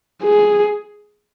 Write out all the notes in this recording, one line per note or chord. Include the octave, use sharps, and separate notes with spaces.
G#4